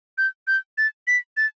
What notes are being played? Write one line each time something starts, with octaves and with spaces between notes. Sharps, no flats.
G6
G6
A6
B6
A6